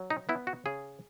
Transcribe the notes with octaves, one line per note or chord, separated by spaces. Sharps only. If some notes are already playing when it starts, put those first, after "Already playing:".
Already playing: F#3
D#4
B3 E4
F#4
C#3 G#4